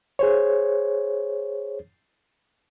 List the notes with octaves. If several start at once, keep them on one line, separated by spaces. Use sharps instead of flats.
G#4 C5 C#5